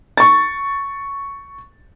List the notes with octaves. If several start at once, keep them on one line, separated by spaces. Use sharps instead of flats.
C#6 A6